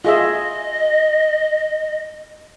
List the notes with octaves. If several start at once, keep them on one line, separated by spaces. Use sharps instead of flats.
F4 G#4 D#5 E5